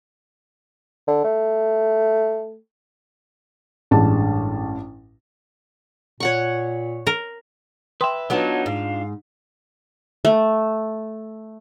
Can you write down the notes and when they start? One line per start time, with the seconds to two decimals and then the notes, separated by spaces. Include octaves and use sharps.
1.08 D3
1.24 A3
3.91 A1 G2 G#3 D4 A5
6.20 A#2 C#5 F#5 C#6
7.07 A#4
8.01 B4 E5 G5 C6 D#6
8.30 F#3 B3 D4 D#4 F4 F#4 C#5 A5
8.66 G#2 F5
10.25 A3